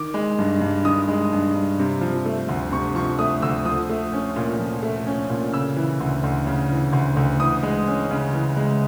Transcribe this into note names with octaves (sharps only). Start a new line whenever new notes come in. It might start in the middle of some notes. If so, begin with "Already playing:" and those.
Already playing: D#3 D6
G#3
G2
G2
D#3 D#6
G#3
G2
G2
C3
F3
A3
D2
C3 C#6
F3 C#6
A3 D#6
D2 E6
F3 D#6
A3
C#4
A#2
F3
A3
C#4
A#2
C#3 E6
E3
D2
D2
C#3
E3
D2
D2
E3 D#6
G#3
C#4
C#3
E3
G#3